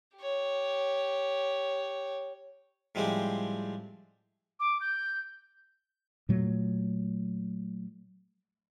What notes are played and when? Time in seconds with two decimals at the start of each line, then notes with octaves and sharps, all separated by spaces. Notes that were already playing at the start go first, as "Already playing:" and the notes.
0.17 G4 C#5
2.95 A2 F3 G3 G#3 C4 G4
4.60 D6
4.81 G6
6.29 A#2 F#3 A3